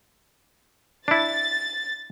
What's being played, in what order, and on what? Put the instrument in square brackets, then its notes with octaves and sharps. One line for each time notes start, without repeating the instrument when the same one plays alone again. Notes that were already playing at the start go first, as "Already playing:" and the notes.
[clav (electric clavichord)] D4 E4 [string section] A6